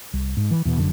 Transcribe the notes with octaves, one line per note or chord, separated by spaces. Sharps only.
C2
G#2
E3
E2 B2
F1 F#2 D3